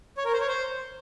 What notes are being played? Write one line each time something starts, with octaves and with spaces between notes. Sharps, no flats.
C#5
A#4
C5
C#5
C5